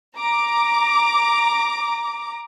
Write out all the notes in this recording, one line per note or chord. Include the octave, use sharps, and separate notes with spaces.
A#5 D6